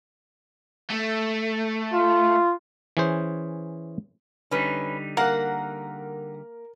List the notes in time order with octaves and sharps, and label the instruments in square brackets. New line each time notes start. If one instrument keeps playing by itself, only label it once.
[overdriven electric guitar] A3
[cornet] F4
[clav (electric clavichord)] E3 C#4 G#4 C5
[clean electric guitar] D3 G3 D#4 [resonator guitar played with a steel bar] C#4 B4
[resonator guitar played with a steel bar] A#3 [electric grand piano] A#4 A#5 [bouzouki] F#5